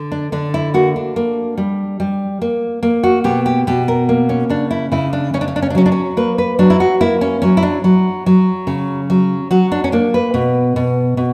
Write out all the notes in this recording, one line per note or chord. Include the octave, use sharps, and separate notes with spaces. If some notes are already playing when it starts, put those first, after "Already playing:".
Already playing: D3
D4
D3 D4
E4
A#3 F#4
D4
A#3
G3
G3
A#3
A#3
F#4
B2 G4
G4
B2 G4
A#4
A#3
C#4
C#3 D4
E4
C#3 E4
D4
C#3 C#4
D4
C#4
D4
C#4
D4
F#3 C#4
D4
C#4
A#3 B4
B4
F#3 D4
E4
F#4
A#3 E4
C#4
F#3 C#4
E4
D4
F#3
F#3
C#3
F#3
F#3 F#4
D4
C#4
A#3 D4
B4
B2
B2
B2